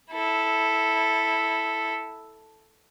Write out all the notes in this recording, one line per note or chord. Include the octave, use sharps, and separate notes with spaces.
E4 A4